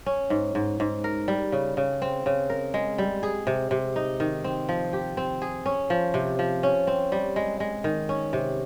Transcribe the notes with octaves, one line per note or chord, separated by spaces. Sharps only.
C#4
G#2
G#2
G#2
A#4
G3
C#3
C#3
C4
C#3
A#4
G#3
G3
G#4
C3
C3
D#4
D#3
C4
F3
G4
C4
G#4
C#4
F3
C3
F3
C#4
C4
G3
G#3
G#3
D#3
C#4
C3